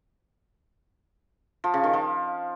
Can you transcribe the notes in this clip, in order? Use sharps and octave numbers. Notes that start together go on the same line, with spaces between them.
F3
C#3
D#3
F3